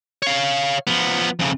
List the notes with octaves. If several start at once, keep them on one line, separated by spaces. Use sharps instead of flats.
C#5 F5
F3 B3
F2 C#3